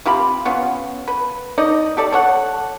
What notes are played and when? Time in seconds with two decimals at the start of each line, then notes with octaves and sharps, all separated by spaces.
0.06 C3 F4 G4 B5
0.45 B3 C#4 F4
1.08 B4
1.58 D#4 D5 D#5
1.97 G4 A4 D5
2.12 A4 C#5 F#5